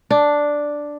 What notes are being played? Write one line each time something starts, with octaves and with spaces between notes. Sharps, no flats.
D4